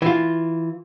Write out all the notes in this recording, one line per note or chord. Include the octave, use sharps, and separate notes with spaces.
E3 F4